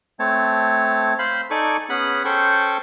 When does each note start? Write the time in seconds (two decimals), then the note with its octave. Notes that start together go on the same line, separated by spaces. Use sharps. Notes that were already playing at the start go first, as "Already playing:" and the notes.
0.20 A3 C4 C#5 A5
1.19 C5 F5 B5 C6
1.51 D#4 A4 D5 G#5 C#6 D6
1.90 B3 C#4 G#4 F#5 B5
2.25 C#4 A4 C5 G5 A5 C#6